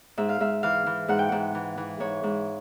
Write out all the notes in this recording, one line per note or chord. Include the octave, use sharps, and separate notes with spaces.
G#2 E5
F5
G#2 E5
E3 F5
E3
G#2 F#5
G5
G#2 F#5
E3
E3
G#2 C#5
G#2